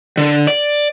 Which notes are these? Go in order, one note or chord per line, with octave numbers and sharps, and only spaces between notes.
D3
D5